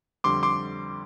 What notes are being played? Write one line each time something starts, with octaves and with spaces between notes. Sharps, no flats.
F2 D3 G3 C6 D6
C6 D6